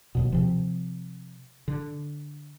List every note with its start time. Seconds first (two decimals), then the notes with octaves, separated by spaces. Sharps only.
0.15 D1 D#2 B2
0.32 C3 F3
1.68 D3